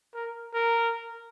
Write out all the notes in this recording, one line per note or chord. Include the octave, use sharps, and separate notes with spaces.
A#4
A#4